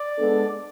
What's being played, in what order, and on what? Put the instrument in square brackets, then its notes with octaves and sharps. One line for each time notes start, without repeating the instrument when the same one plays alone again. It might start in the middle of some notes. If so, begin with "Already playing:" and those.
Already playing: [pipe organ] D5
[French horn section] G#3 B3 D4 A4